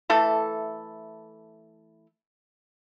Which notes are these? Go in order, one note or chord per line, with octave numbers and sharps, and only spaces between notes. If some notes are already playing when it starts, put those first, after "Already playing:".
E3 A3 A4